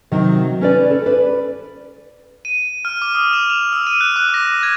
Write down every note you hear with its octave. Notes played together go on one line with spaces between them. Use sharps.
C3 D#3 F#3
C#4 B4 D5
A4
B4 D5
D#7
F6
D6
D#6
E7
F7
E6
D#7
F#6
D6
A#6
G#6